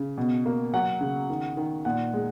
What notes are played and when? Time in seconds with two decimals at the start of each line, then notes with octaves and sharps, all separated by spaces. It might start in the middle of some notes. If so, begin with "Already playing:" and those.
Already playing: C#3
0.18 B2
0.46 A#3
0.74 F#3 F#5
1.01 C#3
1.30 D#3
1.57 D#3
1.85 A#2 F#5
2.14 G#3